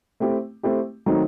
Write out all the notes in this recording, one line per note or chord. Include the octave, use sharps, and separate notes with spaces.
A3 C4 E4 G4
A3 C4 E4 G4
D#3 F#3 A3 C4 D#4